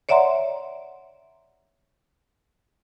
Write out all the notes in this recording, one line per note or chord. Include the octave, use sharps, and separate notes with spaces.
C#5 D5 E5 F#5 A#5 C6